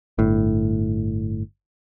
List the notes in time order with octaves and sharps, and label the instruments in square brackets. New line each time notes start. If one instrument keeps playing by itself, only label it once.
[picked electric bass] G1 A2